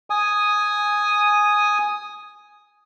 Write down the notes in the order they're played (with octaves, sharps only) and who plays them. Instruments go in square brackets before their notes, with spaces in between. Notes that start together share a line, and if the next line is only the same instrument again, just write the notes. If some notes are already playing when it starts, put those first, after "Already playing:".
[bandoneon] G#5 D#6